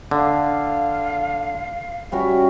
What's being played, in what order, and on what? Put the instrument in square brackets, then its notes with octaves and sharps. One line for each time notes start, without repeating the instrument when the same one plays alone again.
[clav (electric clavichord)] D3 [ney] F5
[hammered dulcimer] G3 C#4 F#4 [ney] E5